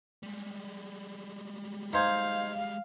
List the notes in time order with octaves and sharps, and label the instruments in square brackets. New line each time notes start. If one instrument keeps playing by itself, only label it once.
[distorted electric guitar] G3 G#3
[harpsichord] D#4 C5 G#5 [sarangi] F5